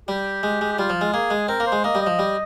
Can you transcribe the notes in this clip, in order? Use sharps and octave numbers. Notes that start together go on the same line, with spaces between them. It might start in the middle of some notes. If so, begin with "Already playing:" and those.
G3 G4
G#3
G#3
G4
G3 F4
F3
G#3
A#3 G#4
G#3
C4 A#4
A#3
C5
G#3
A#3 D#5
G3
D#5
F3
G3